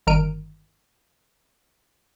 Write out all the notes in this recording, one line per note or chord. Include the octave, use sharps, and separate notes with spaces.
G1 D#3 A#4 F6 D7 D#7